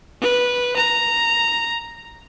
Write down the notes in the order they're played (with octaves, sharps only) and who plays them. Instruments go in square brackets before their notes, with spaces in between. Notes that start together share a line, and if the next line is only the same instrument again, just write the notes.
[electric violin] B4
A#5